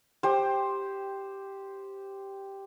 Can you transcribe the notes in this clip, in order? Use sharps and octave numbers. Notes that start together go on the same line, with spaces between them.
G4 C5